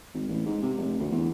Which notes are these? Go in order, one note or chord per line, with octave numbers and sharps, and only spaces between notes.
G#1
A1
G#2
C3
F1
D2
E2